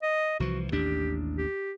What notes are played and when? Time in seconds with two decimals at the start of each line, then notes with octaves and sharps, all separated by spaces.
0.03 D#5
0.40 C2 E3 F3 F#4
0.72 A1 D#2 D4 G4
1.37 G4